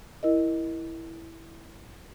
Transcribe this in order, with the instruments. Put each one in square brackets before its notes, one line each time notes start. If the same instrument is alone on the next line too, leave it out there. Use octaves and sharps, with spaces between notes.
[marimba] E4 A#4 D#5